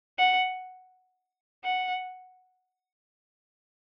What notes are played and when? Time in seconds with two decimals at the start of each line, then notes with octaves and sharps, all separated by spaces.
0.18 F#5
1.64 F#5